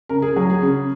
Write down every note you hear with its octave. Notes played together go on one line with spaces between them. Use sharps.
C#3 A#4
G#4
F#3 G#4
G#4
C#3